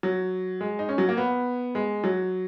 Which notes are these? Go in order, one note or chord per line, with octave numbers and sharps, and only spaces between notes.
F#3
G#3
D#4
C#4
F#3
A#3
B3
G#3
F#3